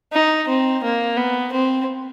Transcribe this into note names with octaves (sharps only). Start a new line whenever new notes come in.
D#4
C4
A#3
B3
C4